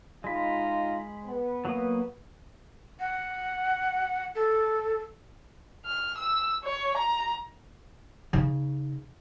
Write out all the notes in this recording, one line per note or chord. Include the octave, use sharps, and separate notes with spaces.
G#3 D#4 F4 B5
B3
F#3 A#3 D#6
F#5
A4
F6
E6
C#5
A#5
C#3 D#4